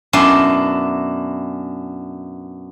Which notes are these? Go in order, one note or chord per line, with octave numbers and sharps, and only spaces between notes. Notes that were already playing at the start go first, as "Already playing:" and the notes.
F#2 B2 D4 E4 D5 C6